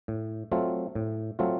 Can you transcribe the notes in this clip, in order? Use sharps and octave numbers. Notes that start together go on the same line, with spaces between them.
A2
F#3 A3 C4 F4
A2
F#3 A3 C4 F4